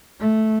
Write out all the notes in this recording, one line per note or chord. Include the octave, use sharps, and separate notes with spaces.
A3